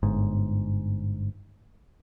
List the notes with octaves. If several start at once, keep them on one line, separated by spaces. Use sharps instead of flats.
G1 G#2